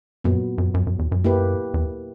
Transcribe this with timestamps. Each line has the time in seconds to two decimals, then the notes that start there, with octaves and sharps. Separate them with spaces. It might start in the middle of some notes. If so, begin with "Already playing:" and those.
0.24 F#2 A#2 F#3 B3
0.58 F#2
0.74 F#2
0.87 F#2
0.99 E2
1.12 F#2
1.24 A#3 E4 G4 B4
1.74 E2